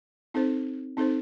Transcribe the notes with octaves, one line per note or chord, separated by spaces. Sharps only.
C4 D#4 A4 C5
C4 D#4 A4 C5